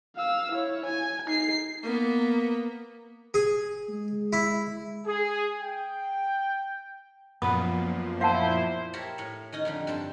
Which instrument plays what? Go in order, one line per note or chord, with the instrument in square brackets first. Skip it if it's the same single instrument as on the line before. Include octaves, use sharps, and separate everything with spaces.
[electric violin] F5 E6
E4 C#5
G#5
D#4 C7
[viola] A#3 B3
[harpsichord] G#4
[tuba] G#3
[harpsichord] E4
[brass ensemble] G#4
G5
[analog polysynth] F#2 A#2 F3 [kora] B3 B4 [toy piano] D#6
[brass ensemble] E4 C5 [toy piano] F5 F#5 A5
[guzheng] G4 A#4 C#5 E5 A5
A2 C#5
D#3 C#4 D#4
F2 D3 G3
G2 C4 A4 C5 A5